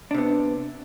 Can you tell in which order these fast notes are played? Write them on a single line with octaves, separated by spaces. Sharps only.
D4 C3 B3